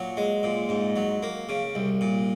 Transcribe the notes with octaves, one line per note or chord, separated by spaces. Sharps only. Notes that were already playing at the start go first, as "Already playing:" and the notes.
Already playing: A#2 F#3
G#3
A#2
G#2
F#3
A#3
C#3
C2
A#2